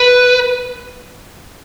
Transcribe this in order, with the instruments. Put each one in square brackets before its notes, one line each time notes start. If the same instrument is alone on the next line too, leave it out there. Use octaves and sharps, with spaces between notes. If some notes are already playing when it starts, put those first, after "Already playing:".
Already playing: [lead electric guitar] B4